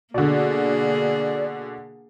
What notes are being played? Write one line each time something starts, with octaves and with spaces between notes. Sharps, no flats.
B2 D3 A#3 G#4 D5